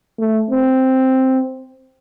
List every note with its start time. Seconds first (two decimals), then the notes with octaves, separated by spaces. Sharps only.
0.19 A3
0.51 C4